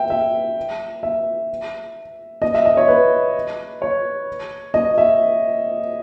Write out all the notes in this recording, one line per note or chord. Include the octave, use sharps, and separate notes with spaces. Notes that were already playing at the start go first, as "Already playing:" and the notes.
Already playing: E5 G5
E5
E5
D#5
E5
D#5
C#5
B4
C#5
D#5
E5